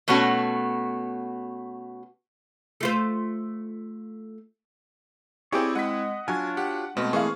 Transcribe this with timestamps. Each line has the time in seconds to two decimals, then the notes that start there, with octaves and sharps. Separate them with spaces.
0.08 B2 A3 B3 C#4 F#4
2.81 A3 F4 C5
5.52 C4 E4 G4 G#4 C#5 D5 G5
5.75 G#3 D#5 F#5 B6
6.28 F#3 D4 F4 F#4 C#5 G#5
6.57 G4 F#5
6.97 B2 G#3 A3 C4 B4
7.13 E3 A#3 G#4 F5 C#6